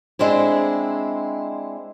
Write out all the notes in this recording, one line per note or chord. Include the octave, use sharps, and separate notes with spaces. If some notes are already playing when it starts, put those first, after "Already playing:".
G#3 C4 D4 E4